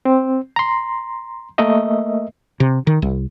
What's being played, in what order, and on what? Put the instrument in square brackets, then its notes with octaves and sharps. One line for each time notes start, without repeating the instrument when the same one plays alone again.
[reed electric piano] C4
A#5 C6
A3 A#3 A#4 D#5 E5
[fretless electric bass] C3
D#3
C2